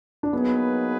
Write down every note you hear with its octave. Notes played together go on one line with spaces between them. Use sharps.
D4
F#3 A#3 B3 D#4 G#4 B4